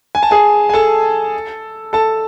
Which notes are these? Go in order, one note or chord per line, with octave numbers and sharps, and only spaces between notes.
G#5
A5
G#4 G#5
G#5
A4 A5
A4 A5